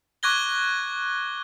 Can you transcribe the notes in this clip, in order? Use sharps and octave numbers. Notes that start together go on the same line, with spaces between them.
C#6 D6 F#6 G#6 A#6 G7